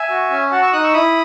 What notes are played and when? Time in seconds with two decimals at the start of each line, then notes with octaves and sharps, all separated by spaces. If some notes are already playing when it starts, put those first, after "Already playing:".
Already playing: E5 G#5
0.10 F#4
0.30 C#4
0.51 F#4 F#5 A5
0.62 C#6 E6
0.72 D#4 D#6 F#6
0.83 C#6 E6
0.93 E4 B5 D#6